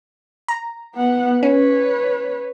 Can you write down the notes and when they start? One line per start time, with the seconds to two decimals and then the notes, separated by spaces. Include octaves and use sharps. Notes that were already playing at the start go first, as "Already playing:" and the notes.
0.48 A#5
0.95 B3 F#5
1.43 C#4 B4 C#5